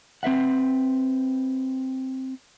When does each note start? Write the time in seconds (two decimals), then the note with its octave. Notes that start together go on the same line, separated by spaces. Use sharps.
0.23 C4 B4 E5 F#5